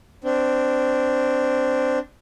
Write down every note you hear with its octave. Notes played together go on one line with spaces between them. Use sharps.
C4 D4